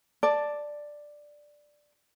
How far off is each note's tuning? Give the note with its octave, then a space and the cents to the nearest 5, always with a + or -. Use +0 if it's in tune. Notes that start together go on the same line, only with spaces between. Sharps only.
D5 +5 A5 +0